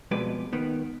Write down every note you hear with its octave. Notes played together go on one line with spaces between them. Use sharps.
F2 B2 G#3 B4 D5
D#3 B3